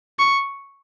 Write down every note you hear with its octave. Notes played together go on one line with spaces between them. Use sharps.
C#6